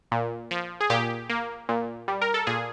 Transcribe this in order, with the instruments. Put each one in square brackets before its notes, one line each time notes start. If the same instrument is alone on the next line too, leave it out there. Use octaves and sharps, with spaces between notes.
[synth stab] A#2
F3
G#4
A#2 G4
A#3
A#2
G3
A#4
A4
A#2 G#4